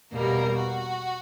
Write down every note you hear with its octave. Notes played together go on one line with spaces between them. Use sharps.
E2 B2 G3 A#3 A#4
F#4